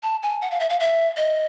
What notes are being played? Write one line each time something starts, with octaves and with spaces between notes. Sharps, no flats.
A5
G#5
F#5
F5
E5
F5
E5
D#5